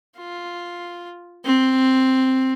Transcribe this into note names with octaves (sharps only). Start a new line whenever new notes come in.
F4
C4